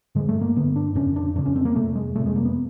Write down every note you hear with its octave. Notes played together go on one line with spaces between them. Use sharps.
G2 D3 G#3
A3
A#3
G2 D3 B3
D4
F2 C#3 C#4
D4
F2 C#3 D4
C#4
C4
A#3
F2 C3 A3
G#3
F2 C3 A3
G#3
A#3
B3